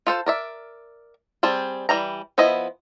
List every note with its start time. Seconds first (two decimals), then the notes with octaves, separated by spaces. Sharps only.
0.07 F4 A4 C5
0.26 A#4 D5 E5
1.43 G3 C4 G#4 A5
1.89 E3 G3 A#5
2.38 F3 B3 E4 D#5